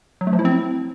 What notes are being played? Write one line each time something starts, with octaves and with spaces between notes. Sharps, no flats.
F#3
A3
F3
E4
C4